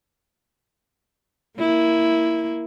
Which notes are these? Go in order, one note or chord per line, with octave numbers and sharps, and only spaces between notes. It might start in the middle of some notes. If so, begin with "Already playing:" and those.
A#3 E4